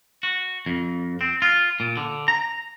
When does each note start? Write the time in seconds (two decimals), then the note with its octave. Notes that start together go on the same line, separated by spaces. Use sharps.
0.23 F#4
0.66 F2
1.21 C4
1.42 F4
1.80 A#2
1.97 D3
2.28 A#5